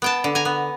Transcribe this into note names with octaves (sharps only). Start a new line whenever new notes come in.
B3 G5 A5
D3
G#5 A#5
B3